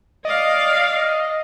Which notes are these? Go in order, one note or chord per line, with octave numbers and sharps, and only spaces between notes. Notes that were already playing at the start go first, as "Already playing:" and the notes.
D5 D#5 F5